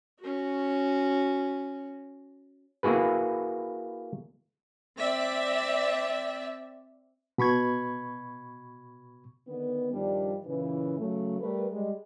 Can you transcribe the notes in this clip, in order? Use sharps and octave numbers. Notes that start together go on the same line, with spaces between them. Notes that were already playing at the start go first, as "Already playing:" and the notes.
C#4 F#4
A#3 E4 F#4 G#4 B4
C4 D5 E5
B2 B5 C#6 G#6
D3 D#3 B3
G2 D#3 F3 G3 D4
A#2 C#3 E3
C#3 F#3 A3
G3 A3 A#4 B4
G3 G#3